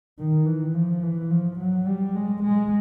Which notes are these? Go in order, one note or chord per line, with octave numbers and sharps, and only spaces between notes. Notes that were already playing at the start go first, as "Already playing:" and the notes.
D#3
E3
F3
E3
F3
F#3
G3
G#3
G#3